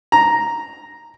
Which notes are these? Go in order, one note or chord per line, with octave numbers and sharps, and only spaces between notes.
A#5